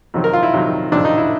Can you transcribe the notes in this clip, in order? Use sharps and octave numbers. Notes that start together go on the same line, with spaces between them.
F2 C3 D#3 F#3
A#4
F4
E4
F2 C3 D#3 F#3
F2 C3 D#3 F#3 D4
D#4
E4